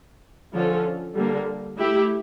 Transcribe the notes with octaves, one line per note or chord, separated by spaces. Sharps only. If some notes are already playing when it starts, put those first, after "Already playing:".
D3 F3 C#4 F4 A4
D3 G3 A#3
A3 E4 G4